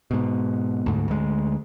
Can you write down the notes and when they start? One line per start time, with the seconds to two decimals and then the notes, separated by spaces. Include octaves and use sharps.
0.11 G#2 B2
0.86 D2 G#2
1.08 D2 G#3